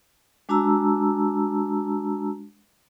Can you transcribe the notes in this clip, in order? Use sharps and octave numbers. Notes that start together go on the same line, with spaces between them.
G#3 D4 F#4 A5 A#5 E6